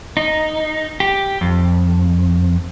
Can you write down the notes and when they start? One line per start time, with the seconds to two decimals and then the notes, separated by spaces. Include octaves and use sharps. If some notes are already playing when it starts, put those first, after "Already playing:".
0.17 D#4
1.00 G4
1.41 F2